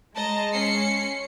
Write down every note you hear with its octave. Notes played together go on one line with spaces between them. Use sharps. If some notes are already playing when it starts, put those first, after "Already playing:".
G#3 D#5 A5 A#5
C#4 C7 C#7